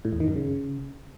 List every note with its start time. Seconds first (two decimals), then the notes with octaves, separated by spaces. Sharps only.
0.05 A2
0.13 E2
0.20 D#3
0.28 F#2
0.36 C#3